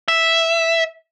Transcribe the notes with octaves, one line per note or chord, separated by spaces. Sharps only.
E5